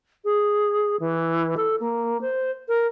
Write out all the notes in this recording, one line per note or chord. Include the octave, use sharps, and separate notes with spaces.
G#4
E3
A4
A#3
C5
A#4